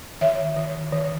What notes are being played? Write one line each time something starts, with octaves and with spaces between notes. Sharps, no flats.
D#3 C#5 E5
D#3
D#3